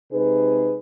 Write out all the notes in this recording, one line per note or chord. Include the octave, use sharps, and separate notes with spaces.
C3 G#3 D#4 G#4 B4